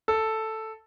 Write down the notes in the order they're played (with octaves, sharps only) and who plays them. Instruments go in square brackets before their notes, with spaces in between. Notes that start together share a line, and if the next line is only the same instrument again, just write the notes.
[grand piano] A4